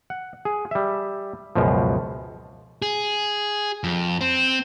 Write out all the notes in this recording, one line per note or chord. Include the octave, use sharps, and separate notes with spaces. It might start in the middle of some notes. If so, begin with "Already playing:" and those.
F#5
G#4
G3 E5
C#2 F#2 B2 F3
G#4
F2
C4